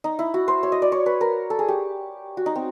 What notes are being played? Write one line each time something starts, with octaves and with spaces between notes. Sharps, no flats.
D#4
E4
F#4
C5
C#5
D#5
D5
C#5
B4
A#4
A4
G#4
G4
F#4
D#4
C4